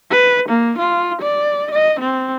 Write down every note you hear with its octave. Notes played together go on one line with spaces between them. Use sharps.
B4
A#3
F4
D5
D#5
C4